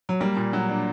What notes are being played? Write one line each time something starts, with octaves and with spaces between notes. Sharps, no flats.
F#3
G3 A#3
A#2
F#3
D4